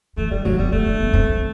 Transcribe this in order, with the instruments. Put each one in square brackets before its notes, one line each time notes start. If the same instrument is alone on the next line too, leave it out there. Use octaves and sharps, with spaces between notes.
[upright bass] E3 [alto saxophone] A3
[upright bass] F#3 [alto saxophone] G3
[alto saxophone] F#3 [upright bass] A3
[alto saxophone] G3 [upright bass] B3
[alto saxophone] A3 [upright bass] C4
[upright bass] D4
B3
C4
C4